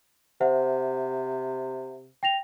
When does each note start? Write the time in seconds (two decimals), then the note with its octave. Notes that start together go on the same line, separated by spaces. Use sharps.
0.41 C3 C5 E5 F#5
2.23 G5 A#6 F7